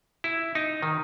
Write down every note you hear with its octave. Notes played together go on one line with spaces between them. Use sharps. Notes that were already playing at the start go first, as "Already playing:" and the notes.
E4
D#4
D#3